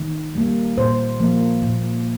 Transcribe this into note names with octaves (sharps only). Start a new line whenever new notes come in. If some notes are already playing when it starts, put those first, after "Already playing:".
Already playing: D#3
G3 A#3
A#2 C5
F3 A#3
A#2